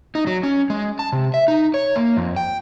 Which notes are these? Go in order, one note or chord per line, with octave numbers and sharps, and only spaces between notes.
D#4
F#3
C#4
G#3
A5
C3
E5
D#4
C#5
A#3
F2
G5